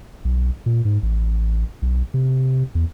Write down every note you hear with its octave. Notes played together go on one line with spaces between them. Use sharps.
B1
A#2
G#2
A1
B1
C3
E2